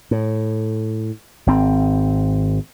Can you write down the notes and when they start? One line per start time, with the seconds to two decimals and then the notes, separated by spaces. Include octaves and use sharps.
0.11 A2
1.46 G#1 C4